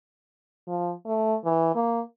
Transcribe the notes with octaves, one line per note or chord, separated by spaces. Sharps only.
F3
A3
E3
A#3